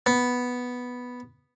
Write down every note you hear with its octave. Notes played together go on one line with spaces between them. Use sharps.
B3